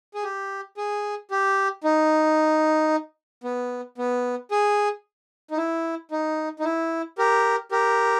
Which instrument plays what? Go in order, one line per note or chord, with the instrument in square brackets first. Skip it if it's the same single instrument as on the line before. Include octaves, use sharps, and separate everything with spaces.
[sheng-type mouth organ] G#4
G4
G#4
G4
D#4
B3
B3
G#4
D#4
E4
D#4
D#4
E4
G4 A#4
G4 A#4